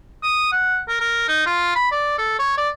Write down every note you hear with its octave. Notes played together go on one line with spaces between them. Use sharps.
D#6
F#5
A#4
A#4
D#4
F4
B5
D5
A4
C#5
D5